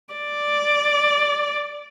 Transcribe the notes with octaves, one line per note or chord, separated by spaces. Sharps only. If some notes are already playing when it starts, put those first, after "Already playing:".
D5